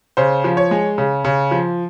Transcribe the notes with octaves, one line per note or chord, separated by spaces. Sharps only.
C#3 C5
F3
C#5
G#3
C#3
C#3
F3